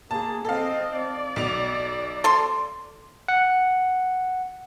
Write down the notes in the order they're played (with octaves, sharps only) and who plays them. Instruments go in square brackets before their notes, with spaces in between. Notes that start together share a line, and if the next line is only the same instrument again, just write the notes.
[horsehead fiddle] A#3 G#4 [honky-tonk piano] A5
[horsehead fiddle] C4 D#5 [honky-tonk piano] A4 F5
[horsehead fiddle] D5
[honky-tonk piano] B1 D6 F7
[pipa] A4 C6
[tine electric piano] F#5